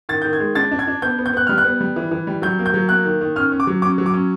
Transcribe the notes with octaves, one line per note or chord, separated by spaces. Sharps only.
D#3 A6
D#3 G6
G#6
G#3
D4 A6
D4
G#6
D4
B3 G6
B3
G6
B3 F#6
G3 F6
F#6
B3
G3
E3
E3
G3
F#3 G6
A#3
G6
F#3
A#3 F#6
D#3
D#3
C#4 F6
C#4
D6
F#3
C#4 D6
F#3
D6
C#4